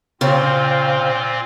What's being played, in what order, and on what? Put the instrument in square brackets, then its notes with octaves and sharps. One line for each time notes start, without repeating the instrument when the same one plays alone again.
[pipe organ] A#2 C4 F4 [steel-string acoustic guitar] C#3 [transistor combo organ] C5 F5 G5